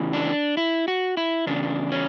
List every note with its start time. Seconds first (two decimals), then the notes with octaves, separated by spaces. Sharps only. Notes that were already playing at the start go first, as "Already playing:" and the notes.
Already playing: E2 C#3 E3
0.13 D4
0.57 E4
0.88 F#4
1.17 E4
1.47 E2 C#3 D4
1.92 C#4